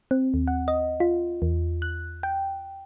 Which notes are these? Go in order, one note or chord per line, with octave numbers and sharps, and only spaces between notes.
C4
D#2
F#5
D#5
F4
E2
F#6
G5